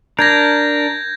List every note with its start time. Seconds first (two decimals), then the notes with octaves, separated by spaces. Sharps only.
0.19 D4 A#4 G6 G#6 A#6